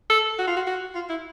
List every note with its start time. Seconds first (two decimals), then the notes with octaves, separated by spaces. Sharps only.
0.10 A4
0.38 F#4
0.47 F4
0.57 F#4
0.67 F#4
0.95 F4
1.09 E4